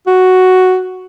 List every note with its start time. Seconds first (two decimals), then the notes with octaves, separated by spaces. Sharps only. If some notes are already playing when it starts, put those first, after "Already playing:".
0.07 F#4